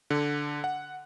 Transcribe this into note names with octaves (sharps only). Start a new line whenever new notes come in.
D3
F#5